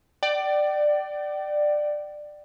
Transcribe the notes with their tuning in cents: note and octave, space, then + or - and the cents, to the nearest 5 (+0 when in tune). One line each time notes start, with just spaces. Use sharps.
D5 +15 G5 -35